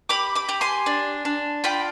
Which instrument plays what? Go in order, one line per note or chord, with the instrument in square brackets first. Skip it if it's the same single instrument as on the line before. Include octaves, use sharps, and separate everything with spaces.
[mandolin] G4 B5 D6
B5 D6
G4
G#5 C6
D4
D4
F4 G5 B5